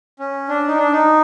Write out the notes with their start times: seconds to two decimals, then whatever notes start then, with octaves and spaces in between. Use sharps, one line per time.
0.19 C#4
0.49 D4
0.67 D#4
0.77 D4
0.92 D#4